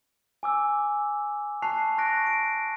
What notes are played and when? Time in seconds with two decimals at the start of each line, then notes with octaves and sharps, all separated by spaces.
0.43 G#5 D6 E6
1.62 A5 C#6 F#6 C7 F7
1.98 C#6 F#6 A#6 D7
2.27 D7